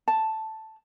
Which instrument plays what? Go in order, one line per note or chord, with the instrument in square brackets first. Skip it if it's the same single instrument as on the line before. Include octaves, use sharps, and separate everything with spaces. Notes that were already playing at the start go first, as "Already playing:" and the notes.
[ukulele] A5